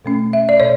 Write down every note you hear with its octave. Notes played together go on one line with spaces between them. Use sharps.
B2 A3 C#4
E5
D5
B2 C#5